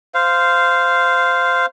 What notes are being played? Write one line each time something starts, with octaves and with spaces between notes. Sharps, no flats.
C5 F5